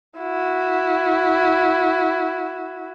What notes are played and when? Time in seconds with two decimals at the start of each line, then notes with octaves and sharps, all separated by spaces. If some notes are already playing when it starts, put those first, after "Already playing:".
0.19 E4 F#4